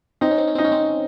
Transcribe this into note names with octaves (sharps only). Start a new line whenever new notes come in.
C4 D#4
C#4
C4
C#4
C4 D#4
C#4
C4